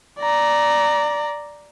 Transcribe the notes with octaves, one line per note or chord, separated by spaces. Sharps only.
D5 A#5